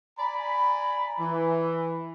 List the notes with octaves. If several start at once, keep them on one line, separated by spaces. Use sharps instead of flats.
D5 G#5 A#5 B5
E3